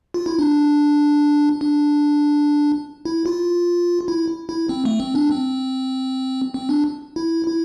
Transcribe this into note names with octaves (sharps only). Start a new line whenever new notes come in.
F4
E4
D4
D4
E4
F4
E4
E4
C4
A3
C4
D4
C4
C4
D4
E4
E4